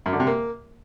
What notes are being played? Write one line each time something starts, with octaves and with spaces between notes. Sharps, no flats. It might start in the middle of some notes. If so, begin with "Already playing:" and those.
F#2
D3
C3
A#3